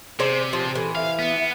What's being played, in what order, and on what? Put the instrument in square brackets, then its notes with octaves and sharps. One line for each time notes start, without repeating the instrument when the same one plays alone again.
[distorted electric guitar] C3 [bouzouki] G#4 C5 D5
[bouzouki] F3 [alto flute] G4
[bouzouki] E3 [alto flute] A4
[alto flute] E5 [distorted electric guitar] F5
[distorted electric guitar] B3